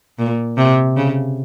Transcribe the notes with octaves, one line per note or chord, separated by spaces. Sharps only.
A#2
C3
C#3